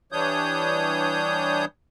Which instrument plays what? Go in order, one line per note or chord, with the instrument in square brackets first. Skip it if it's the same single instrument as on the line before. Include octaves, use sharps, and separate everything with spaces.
[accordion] E3 G3 D4 C#5 D#6 G6